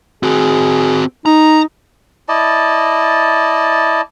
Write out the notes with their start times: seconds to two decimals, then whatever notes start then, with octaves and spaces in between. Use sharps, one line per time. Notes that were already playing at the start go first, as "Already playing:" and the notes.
0.23 C4 F#4 G#4
1.26 D#4 A#5
2.29 E4 D5 D#5 A5